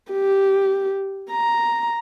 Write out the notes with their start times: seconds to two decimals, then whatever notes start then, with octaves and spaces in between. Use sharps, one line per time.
0.12 G4
1.32 A#5